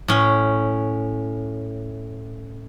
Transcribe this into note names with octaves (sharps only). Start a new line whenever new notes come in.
A2 C#4